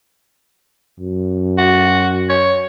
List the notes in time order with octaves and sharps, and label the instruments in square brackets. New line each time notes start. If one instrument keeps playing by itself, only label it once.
[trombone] F#2
[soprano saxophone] F#4
C#5